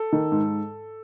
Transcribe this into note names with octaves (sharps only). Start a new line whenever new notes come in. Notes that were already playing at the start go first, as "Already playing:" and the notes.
Already playing: A4
D#3
G#2